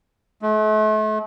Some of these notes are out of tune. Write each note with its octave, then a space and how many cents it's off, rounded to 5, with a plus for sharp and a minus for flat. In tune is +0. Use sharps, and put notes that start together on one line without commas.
A3 -40